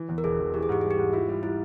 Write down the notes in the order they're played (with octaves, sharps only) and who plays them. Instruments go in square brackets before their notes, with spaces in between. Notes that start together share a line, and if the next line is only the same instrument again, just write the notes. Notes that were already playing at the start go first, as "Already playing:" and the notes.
Already playing: [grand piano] E3
E2
[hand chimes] A#4
[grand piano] E1 [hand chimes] G#4
[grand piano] E1
[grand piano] E3 [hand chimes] G4
[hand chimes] G#4
[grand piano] G#2 [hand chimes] G4
[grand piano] G3 [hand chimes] G#4
[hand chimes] G4
[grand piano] G#2
[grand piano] E4 [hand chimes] F4
[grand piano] G3
[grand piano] G3 [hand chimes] E4